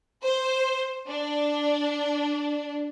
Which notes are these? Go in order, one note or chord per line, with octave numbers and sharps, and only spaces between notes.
C5
D4